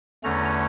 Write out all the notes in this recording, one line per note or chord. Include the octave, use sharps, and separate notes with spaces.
E2 D3 A3 C#4 A#5